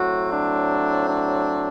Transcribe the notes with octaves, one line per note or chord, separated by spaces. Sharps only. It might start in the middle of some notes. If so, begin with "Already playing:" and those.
Already playing: A2 F#3 C4 F#4
D4
D4